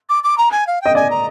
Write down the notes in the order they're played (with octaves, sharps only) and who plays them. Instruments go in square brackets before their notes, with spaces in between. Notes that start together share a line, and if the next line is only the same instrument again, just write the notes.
[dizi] D6
D6
A#5
G#5
F5
[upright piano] D#5 [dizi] G5
[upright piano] D5 [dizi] G#5
[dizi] A#5